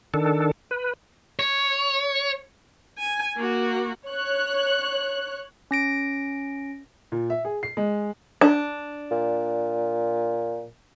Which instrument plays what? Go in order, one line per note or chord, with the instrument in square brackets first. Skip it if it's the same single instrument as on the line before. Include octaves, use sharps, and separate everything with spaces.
[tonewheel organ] D#3 D4 A4
B4
[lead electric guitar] C#5
[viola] G#5
A#3 F#4
[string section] C#5 F#6
[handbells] C#4 A#6 D7
[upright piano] A#2
E5
G#4
C7
G#3
[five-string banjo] D4
[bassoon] A#2